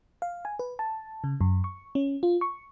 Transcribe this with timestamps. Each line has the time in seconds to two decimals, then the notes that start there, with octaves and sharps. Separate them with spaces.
0.22 F5
0.45 G#5
0.59 B4
0.79 A5
1.24 C#3
1.41 F#2
1.64 C#6
1.95 C#4
2.23 F4
2.41 C#6